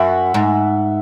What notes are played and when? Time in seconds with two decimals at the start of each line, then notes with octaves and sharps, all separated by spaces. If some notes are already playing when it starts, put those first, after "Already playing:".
Already playing: F#2 E5 F#5
0.34 G#2